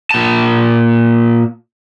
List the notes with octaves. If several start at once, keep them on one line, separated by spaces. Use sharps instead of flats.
A#2 A5